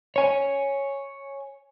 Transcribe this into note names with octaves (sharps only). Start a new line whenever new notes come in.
C#5 G#5